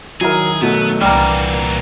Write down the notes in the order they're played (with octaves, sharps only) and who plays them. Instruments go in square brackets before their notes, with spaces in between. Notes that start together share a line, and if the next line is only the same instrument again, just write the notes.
[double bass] D#3 [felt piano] F#3 E4 A#4 [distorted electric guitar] G#4
[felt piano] B2 F#3 A3 [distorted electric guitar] B3
[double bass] C2 E3 [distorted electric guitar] A#2 F#4 [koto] G3 A#3 [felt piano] D4 A#5